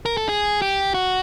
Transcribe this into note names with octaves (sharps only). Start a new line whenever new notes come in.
A#4
A4
G#4
G4
F#4